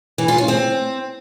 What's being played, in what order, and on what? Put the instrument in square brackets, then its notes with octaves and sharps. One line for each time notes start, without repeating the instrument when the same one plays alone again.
[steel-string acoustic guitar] E3
F4
C#4
C4